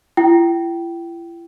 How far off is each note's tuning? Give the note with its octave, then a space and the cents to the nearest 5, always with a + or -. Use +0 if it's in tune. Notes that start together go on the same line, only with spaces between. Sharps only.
E4 +40 G5 -20